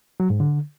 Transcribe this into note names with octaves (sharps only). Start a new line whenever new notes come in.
F#3
G#2
D3